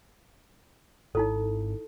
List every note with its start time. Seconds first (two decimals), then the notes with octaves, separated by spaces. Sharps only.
1.15 G#1 D#4 E4 A4